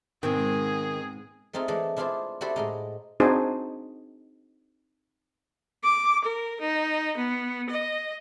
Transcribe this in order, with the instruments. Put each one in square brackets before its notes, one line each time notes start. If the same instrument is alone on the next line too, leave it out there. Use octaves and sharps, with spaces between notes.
[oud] G#2 B2 G#3 [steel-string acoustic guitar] D#3 [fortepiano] C4 G5 [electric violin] G#4
[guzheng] A3 C4 D#4 F4 G#4
E3 G#3 A3 D4
D4 E4 F4 G#4 C5 D5
D4 E4 F#4 G4 A4 C5
A2 G#3 D#4
[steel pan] C4 D4 D#4 F#4 G#4 C5
[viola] D6
A#4
D#4
B3
D#5